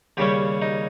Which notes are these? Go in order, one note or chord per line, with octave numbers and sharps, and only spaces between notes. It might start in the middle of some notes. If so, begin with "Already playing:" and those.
D#2 C#3 G3 C#4 G4
D#4